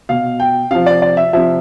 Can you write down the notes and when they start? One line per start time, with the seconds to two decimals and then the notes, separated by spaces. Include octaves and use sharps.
0.09 B2 F5
0.40 G5
0.71 C3 F3 F5
0.86 D5
1.02 D5
1.17 E5
1.33 C3 F3 E5